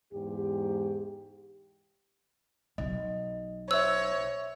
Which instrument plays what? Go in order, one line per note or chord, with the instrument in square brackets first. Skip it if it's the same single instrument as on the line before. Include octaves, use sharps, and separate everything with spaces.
[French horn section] E2 G#2 G4
[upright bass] B1 [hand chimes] D#5
[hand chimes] C5 E5 [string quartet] C#5 [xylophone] E6